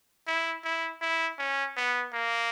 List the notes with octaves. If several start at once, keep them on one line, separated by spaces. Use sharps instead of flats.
E4
E4
E4
C#4
B3
A#3